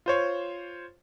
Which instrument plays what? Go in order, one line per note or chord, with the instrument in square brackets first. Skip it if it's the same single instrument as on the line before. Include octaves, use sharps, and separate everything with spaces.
[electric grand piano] F4 C5 C#5